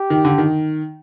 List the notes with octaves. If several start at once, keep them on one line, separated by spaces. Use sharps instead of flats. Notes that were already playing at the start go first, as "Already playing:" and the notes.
Already playing: G4
D#3
D3
D#3